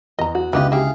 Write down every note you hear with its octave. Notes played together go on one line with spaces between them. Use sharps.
E2 D#5 A#5
F#4
C#2 D3 E3 B3 F4 G4 B4 D#5
E4 G4 G#4 F5